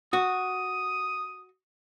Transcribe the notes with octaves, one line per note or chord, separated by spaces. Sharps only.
F#4 D#6